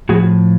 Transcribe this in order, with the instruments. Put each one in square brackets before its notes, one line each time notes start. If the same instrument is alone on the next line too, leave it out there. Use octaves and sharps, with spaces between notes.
[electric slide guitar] A2 F3 F#4 G#4